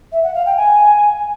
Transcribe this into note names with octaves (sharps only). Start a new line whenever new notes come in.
E5
F#5
F5
G5
G#5